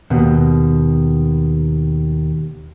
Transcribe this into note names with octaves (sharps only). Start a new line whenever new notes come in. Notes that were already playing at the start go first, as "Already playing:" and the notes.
D#2 B2